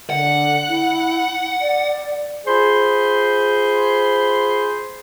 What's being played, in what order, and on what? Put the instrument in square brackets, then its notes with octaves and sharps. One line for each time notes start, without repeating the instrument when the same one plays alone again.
[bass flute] D3 [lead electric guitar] F#5
[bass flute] E4
D5
[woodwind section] F4 G#4 C5 B5 C6